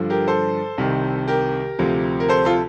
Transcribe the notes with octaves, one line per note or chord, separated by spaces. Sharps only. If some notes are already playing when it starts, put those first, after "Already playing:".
Already playing: G2 D3 F3
G4 A#4
A4 C5
C2 C3 D#3
G4 A#4
D2 C3 F3
A#4
A4 C5
F4 A4